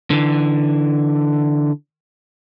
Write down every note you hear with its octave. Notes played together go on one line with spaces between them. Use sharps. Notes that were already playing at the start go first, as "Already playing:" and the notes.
D3 E3